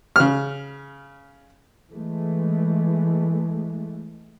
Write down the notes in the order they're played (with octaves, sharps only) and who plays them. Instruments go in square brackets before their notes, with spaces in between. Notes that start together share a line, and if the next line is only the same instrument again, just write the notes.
[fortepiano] C#3 F6
[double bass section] E3 G#3 A3